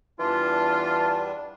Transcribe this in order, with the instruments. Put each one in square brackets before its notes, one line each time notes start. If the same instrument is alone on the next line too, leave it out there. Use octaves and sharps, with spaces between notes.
[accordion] E2 G3 D4 [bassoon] E3 [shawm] F4